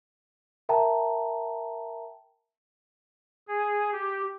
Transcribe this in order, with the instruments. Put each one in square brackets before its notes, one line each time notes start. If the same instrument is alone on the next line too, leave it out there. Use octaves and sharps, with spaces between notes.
[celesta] A#4 E5 G5 A5 A#5
[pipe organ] G#4
G4